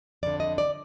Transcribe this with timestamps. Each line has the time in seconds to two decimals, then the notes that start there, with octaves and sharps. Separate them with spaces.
0.23 F2 D3 D5
0.40 D#5
0.58 D5